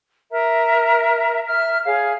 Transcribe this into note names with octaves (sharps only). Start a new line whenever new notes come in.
A#4 E5 A#5
E5 F6
G#4 C#5 F5